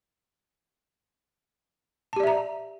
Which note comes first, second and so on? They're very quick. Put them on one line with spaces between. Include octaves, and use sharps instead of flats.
A5 G4 D5 E5 A#5